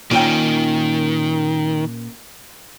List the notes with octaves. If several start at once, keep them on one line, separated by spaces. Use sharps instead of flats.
A#2 D#3 C#4 G5